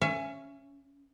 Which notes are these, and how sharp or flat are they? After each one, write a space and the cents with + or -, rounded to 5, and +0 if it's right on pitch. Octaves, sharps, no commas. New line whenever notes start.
C#4 +0 E5 +30